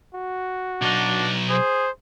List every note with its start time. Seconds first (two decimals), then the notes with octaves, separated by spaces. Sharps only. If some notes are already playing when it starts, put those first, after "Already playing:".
0.14 F#4
0.82 B1 D4 D#4
1.49 G#4 C5